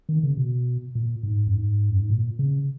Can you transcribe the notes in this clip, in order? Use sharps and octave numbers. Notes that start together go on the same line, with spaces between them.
D#3
C#3
B2
A#2
G#2
F#2
G#2
F#2
G#2
A#2
C#3